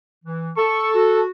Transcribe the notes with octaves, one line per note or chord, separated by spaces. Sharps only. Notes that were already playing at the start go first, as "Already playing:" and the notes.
E3
A4 C#6
F#4